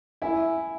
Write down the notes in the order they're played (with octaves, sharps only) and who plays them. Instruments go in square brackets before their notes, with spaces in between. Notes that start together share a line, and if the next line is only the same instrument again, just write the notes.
[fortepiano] E4 [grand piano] E5 G#5